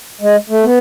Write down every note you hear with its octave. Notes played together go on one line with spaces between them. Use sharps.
G#3
A3
B3